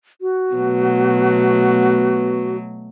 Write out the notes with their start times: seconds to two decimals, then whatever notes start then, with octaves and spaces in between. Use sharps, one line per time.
0.21 F#4
0.54 B2 F#3 A3 B3